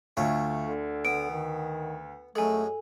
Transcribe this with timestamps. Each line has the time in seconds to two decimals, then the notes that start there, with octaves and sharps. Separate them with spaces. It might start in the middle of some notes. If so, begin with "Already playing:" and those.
0.17 D2 A3 F4 C#5
0.65 D3
1.05 B3 D7
1.30 D#3
2.35 F#2 G#3 A3 A4 G#5